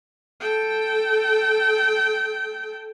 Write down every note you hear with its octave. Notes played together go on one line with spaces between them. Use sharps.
A4 G5